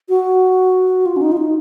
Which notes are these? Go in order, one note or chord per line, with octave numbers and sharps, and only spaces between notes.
F#4
F4
C#4
D#4
F4
D#4